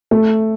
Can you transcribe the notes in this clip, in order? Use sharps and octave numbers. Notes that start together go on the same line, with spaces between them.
A3